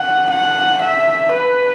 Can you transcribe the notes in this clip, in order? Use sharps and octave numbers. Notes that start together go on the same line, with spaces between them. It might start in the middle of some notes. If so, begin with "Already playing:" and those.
Already playing: F#5
F#5
E5
B4